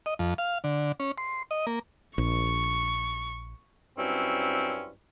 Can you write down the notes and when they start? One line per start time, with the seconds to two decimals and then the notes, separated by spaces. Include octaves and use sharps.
0.06 D#5
0.19 F2
0.38 F5
0.64 D3
1.00 C#4
1.18 C6
1.51 D#5
1.67 A#3
2.18 A#1 C#6
3.97 G2 F#3 C4 C#4 E4